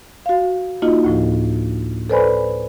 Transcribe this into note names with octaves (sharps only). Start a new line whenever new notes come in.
F#4 F5
A#3 D#4 F4 F#4 D#5
D2 A2 F3
A4 B4 C5 D5 G#5 B5